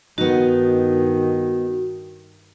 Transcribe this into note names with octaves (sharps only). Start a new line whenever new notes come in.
G2 D#3 B3 D#4 F#4